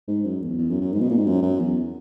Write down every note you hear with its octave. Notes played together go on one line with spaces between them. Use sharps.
G#2
F#2
E2
E2
F#2
F#2
G#2
B2
A#2
G#2
F#2
F#2
E2